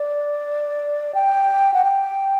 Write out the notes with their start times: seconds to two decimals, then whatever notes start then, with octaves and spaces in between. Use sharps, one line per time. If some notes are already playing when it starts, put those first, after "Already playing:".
Already playing: D5
1.14 G5
1.74 F#5
1.85 G5